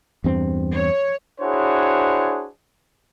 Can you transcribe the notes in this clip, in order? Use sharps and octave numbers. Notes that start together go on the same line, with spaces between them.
E2 G2 C4
C#5
D4 E4 F#4 G#4 C5 C#5